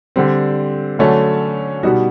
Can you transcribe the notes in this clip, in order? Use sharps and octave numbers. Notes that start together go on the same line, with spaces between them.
D3 G3 C4
D3 F#3 A3 C#4
B2 G3 B3 D#4 F#4